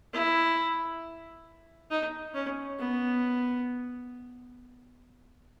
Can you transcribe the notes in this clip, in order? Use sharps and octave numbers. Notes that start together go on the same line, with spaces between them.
E4
D#4
C#4
B3